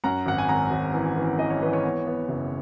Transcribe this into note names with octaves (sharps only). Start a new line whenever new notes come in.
F#2 F#5 A#5
G#1 F#5
G#5
G#1 F#5 A#5
G#1
E3
E3
E3 D#5
C#5
E3 B4
C#5
B3
B3
F#1